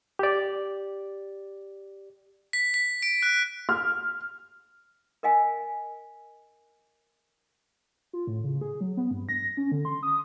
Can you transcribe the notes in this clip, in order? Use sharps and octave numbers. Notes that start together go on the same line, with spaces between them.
G4 D5
B6
B6
D7
F#6
F6
A#4 D#5 F5 G#5
F4
A2
C#3
G#4
F#3
B3
G2
A#6
C#4
D3
C6
D#6